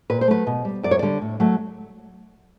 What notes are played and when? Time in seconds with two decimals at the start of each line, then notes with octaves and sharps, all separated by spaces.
0.10 A#2 B4
0.21 C5
0.28 F#3 A3 B4
0.47 B2
0.65 G3
0.83 F#2 D5
0.91 C#5
0.99 D3 G3 D5
1.21 A2
1.40 F#3 A3